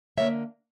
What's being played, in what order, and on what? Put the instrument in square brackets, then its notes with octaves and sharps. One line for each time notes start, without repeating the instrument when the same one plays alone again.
[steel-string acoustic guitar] D3 F#3 A#3 C#5 E5